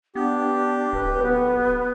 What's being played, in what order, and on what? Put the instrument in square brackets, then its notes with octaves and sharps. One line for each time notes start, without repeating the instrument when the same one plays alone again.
[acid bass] B3 [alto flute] D4 [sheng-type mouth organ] G4
[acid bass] D1 [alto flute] B4
[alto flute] B3